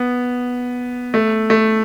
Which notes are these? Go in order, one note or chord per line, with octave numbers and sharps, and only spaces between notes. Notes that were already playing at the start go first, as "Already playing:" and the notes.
Already playing: B3
A3
A3